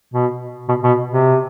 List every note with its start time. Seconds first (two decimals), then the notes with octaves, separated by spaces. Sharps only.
0.14 B2
0.68 B2
0.83 B2
1.12 C3